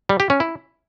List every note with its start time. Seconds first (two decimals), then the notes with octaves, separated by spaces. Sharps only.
0.09 G3
0.20 G4
0.30 C#4
0.40 E4